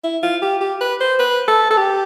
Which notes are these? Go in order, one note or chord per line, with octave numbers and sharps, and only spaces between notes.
E4
F4
G4
G4
B4
C5
B4
A4
A4
G4